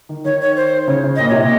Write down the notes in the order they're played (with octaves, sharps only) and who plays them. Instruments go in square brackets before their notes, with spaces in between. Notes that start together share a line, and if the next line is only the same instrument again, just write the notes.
[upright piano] D#3
[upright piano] D#3 [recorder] C#5
[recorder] C#5
C5
[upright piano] C#3 [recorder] C#5
[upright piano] C#3
[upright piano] A#2 [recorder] D#5
[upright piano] C3 [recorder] C#5
[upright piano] A#2 [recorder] D#5